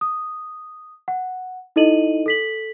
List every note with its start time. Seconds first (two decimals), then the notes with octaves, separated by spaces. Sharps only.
0.01 D#6
1.08 F#5
1.76 D#4 E4 A4 D#5 D#7 F#7
2.26 A4 B6 F#7